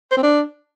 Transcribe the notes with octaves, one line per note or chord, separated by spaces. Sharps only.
C5
C4
D4